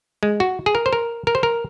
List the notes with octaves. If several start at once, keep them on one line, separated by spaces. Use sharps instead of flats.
G#3
F#4
G#4
A#4
C5
A#4
A#4
C5
A#4